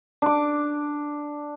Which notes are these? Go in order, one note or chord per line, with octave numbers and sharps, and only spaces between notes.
D4 D6